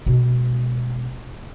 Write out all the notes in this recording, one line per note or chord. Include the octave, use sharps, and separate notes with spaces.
B2 G#3